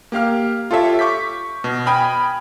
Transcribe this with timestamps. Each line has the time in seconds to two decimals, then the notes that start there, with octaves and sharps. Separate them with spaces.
0.12 A#3 G4 F5 F6
0.71 F4 G4 A4 C#5 E5
0.99 C#6 D6 G6 B6
1.64 B2
1.86 G5 G#5 B5 D#6 F6